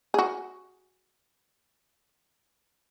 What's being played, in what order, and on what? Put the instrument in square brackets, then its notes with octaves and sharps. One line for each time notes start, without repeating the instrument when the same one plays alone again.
[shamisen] F#4 G#4